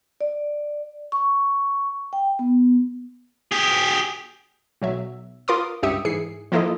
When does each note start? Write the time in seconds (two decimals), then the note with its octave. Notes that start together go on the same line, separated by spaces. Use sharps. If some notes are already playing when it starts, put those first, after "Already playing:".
0.21 D5
1.12 C#6
2.13 G5
2.39 B3
3.52 G4 G#4
4.82 B1 F#3 E5
5.48 F4 A#4 B4 C6 D6 D#6
5.83 C#2 G2 G4 E5 D#6 C#7
6.05 G#2 E3 G#4 C7 C#7
6.52 F3 A#3 E4 F4 A4 D#5